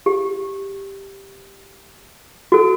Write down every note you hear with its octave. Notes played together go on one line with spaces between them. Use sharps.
G4
F#4 A4